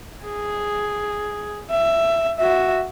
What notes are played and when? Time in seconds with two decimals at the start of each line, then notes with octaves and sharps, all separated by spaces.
0.24 G#4
1.71 E5
2.39 F#4 E5